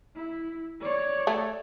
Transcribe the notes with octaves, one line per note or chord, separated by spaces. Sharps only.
E4
C#5 D5
A3